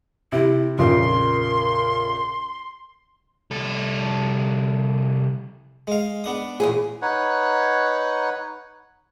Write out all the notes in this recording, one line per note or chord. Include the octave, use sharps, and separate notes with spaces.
C3 E4
A#1 F2 C#3 A#4 C6
C2 A4
G#3 F5
B3 D4 D#6
E2 A#2 G#4
D#4 B4 C#5 F#5